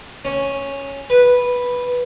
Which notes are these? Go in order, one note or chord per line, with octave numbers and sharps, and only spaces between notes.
C#4
B4